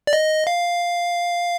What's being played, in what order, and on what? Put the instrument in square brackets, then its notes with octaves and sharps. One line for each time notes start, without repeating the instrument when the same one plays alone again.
[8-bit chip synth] D5
D#5
F5